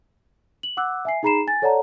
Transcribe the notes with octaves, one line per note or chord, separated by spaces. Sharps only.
F#7
F#5 D6 E6 F#6
E5 G#5 C7
D#4 G#4 A#5 B5 C7 E7
G#5 A6
A4 C#5 D5 F#5 A5 A#5